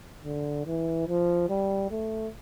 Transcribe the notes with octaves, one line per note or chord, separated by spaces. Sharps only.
D3
E3
F3
G3
A3